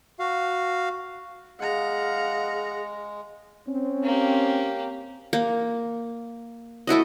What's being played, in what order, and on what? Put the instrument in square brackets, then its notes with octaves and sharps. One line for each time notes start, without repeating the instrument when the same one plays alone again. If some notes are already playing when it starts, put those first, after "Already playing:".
[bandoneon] F#4 F5
[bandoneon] G#3 [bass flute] G#4 [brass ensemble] F5 [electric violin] F#5 A#5
[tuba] C4 [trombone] C#4
[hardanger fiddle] A#3 G4
[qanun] A#3
A3 E4 F#4 D#5